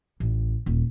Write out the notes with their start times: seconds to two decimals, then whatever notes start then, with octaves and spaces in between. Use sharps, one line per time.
0.20 A1
0.66 D#1